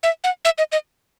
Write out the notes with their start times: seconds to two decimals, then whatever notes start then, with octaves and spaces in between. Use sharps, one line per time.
0.03 E5
0.24 F#5
0.45 E5
0.58 D#5
0.72 D#5